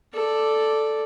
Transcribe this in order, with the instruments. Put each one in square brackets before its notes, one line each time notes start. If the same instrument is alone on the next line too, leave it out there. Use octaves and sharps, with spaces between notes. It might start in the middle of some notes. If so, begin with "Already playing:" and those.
[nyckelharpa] A4 D5